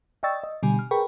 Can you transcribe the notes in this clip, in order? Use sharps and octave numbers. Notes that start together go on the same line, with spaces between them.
D5 D#5 G5 C#6 E6 A6
D#5
B2 D3 G3 G#5
F6
G#4 A#4 B4 G5 B5 C#6